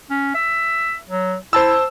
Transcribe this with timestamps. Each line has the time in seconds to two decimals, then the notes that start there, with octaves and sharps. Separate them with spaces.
0.10 C#4
0.35 E5
1.10 F#3
1.53 E4 C5 A5 E6